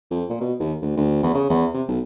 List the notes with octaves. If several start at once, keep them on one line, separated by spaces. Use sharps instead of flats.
F2
A#2
B2
D#2
D2
D2
E2
C#3
E2
C3
B1